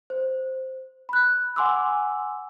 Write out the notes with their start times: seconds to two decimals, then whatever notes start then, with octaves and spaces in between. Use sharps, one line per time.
0.10 C5
1.09 B5 F#6
1.56 F#5 G#5 C6 D6 E6